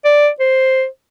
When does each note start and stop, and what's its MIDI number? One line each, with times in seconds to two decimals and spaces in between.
0.05 0.29 74
0.40 0.86 72